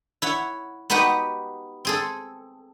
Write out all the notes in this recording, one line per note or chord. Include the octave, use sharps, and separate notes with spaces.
E4 C#5 F#5
B3 D#4 F#4 G4 B4 F#5
C4 G#4 A4